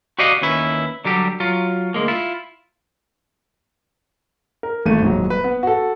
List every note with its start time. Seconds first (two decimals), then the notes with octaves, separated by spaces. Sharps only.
0.19 F#4 G4 D5 D#5 F5 F#5
0.42 D#2 C#4 E4 B4
1.05 D3 F#3 G3 G4
1.40 F#3 F4
1.94 D2 A#2 G#3 A#3
2.08 E4 F4
4.63 A#4
4.86 G#1 A3 D#7
5.02 D#1 G#2 F#3
5.30 B4
5.44 B3
5.63 F#4 A4